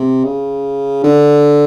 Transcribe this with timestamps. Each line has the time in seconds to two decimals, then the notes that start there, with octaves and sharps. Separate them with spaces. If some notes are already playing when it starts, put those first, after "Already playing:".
Already playing: C3
0.24 C#3
1.04 D3